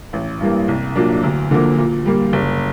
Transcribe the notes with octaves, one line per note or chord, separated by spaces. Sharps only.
A1
G2 E3 G3 A#3
C2
A#2 F#3 A#3 D4
D2
D3 F3 A#3
A#2
G3 A#3
F#1